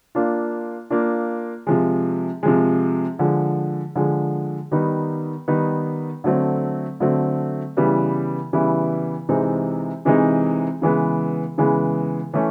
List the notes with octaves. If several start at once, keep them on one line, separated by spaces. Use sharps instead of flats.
A#3 D4 F4
A#3 D4 F4
C3 F3 G#3
C3 F3 G#3
D3 F3 G#3
D3 F3 G#3
D#3 G3 B3 D#4
D#3 G3 B3 D#4
D3 F#3 A3 C4
D3 F#3 A3 C4
C#3 E3 G3 B3 E4
C#3 E3 G3 B3 E4
C3 E3 G#3 C4 D#4
C3 E3 G#3 C4 D#4
C#3 E3 G#3 B3
C#3 E3 G#3 B3
E3 A3 C#4